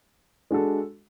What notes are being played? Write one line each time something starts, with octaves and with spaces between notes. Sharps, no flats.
G#3 D4 F#4 A4